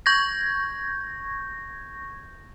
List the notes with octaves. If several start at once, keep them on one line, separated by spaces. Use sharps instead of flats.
C#6 G6 G#6 A#6